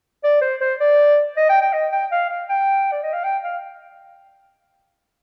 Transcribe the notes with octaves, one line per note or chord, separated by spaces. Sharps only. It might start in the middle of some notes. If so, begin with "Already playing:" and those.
D5
C5
C5
D5
D#5
G5
G5
D#5
G5
F5
F5
G5
D5
D#5
F5
G5
F5